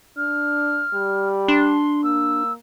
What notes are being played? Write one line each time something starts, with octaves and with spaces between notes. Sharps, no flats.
D4 F6
G3
D4 C6
A#3 E6